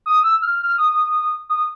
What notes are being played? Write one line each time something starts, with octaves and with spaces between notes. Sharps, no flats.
D#6
E6
F6
F6
D#6
D#6